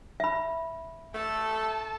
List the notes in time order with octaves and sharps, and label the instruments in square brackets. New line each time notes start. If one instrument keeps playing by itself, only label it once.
[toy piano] E5 B5
[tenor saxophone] A3 [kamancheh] A4 A5